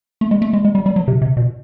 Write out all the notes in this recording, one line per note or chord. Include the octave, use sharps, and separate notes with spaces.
A3
G#3
A3
G#3
G#3
G3
G3
F#3
C3
C3
B2